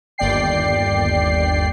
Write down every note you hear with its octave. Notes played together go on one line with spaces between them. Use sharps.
G1 D#2 D5 G5 C7